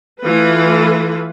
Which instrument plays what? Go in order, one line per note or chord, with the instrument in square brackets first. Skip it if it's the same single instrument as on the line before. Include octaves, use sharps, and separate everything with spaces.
[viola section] E3 A3 F4 A4 B4